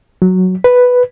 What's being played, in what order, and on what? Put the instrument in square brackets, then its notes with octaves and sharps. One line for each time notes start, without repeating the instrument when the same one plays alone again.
[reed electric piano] F#3
B4